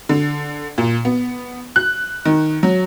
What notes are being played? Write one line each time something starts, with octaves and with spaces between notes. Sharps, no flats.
D3
A#2
B3
F#6
D#3
F#3